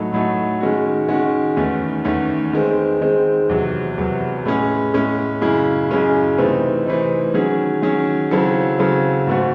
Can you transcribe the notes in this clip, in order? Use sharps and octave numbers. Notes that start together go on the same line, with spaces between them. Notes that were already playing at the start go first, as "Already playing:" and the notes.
Already playing: A2 F#3 A3 D#4 A4
A2 F#3 A3 D#4 A4
D#3 G#3 C#4 F#4
D#3 G#3 C#4 F#4
E2 D#3 A3 C#4
E2 D#3 A3 C#4
D#3 G#3 C4
D#3 G#3 C4
E2 C3 F#3
E2 C3 F#3
A2 G#3 C#4 G#4
A2 G#3 C#4 G#4
F#2 C#3 G#3 C#4 E4
F#2 C#3 G#3 C#4 E4
C3 E3 A3 C4 D#4
C3 E3 A3 C4 D#4
D#3 F#3 C#4 G#4
D#3 F#3 C#4 G#4
C#3 F#3 C4 E4 A4
C#3 F#3 C4 E4 A4
G#2 D#3 A3 C4 F#4